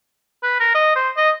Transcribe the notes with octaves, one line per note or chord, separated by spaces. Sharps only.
B4
A#4
D#5
C5
D#5